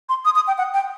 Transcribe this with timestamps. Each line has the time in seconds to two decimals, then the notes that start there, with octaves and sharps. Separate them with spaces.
0.09 C6
0.25 D#6
0.36 D#6
0.48 G5
0.58 F#5
0.74 G5